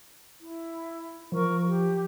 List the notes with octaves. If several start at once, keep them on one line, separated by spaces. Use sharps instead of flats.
E4
F3 A#4 C#6
G4